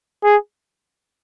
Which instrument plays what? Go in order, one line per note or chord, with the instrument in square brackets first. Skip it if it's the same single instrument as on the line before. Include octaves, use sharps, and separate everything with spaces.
[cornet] G#4